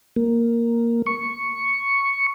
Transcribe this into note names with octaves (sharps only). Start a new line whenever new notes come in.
A#3
C#6